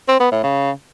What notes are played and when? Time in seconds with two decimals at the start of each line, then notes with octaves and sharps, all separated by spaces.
0.08 C4
0.20 B3
0.32 A2
0.44 C#3